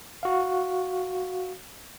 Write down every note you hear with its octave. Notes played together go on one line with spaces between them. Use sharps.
F#4 F5